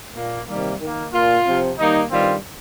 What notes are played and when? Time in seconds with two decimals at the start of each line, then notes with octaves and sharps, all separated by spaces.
0.15 A#2 A#3
0.48 C3 D#3 G3 A#3
0.81 D#3 A#3
1.13 A#2 A#3 F4
1.46 C3 F3 C4
1.78 D#3 G3 A#3 D#4
2.11 G2 D#3 G3 C4 F4